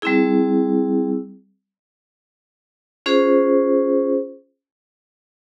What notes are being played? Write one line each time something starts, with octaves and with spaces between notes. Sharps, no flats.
G3 C4 E4 G#4
C#4 F4 G#4 C5